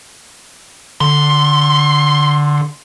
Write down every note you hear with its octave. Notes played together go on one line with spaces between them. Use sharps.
D3 C6